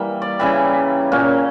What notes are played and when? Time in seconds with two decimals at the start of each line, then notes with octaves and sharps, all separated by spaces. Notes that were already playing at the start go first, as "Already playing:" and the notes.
Already playing: E3 G3 A#3 E5
0.22 D5
0.39 C#3 E3 G3 E5
1.12 A#2 A#3 C#4